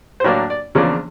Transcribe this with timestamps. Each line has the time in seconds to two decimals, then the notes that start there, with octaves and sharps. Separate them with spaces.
0.20 C5
0.24 A2 F#3 A#3 D4 C#5
0.50 D5
0.75 E2 C#3 F3 A#3 D4 C#5